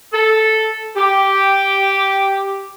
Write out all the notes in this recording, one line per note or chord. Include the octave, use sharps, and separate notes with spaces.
A4
G4